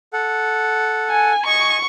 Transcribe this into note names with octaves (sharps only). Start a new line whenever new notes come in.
A4 F#5
G#5
D#5 G#5 C#6